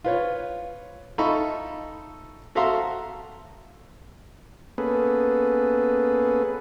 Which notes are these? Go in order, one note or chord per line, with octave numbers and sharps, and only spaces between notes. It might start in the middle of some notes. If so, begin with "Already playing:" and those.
F4 B4 C#5
D#4 F4 A4 E5 B5 C#6
F#4 A4 E5 F5 A#5 C6
A#3 B3 C#4 G#4 A4 B4